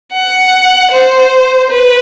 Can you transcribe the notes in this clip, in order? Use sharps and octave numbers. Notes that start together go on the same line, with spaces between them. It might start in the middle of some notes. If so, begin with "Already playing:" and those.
F#5
C5
B4